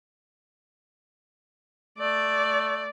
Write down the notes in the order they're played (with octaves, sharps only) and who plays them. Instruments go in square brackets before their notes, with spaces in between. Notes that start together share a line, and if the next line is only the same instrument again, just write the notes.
[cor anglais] A3 [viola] D5